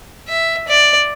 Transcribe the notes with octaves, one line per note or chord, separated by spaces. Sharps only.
E5
D5